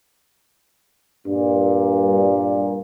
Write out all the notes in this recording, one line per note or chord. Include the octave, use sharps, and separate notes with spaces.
G2 A#2